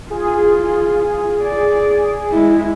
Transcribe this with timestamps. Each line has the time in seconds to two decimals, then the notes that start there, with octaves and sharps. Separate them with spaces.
0.11 F4 G#4
1.43 D5
2.31 G#3 E4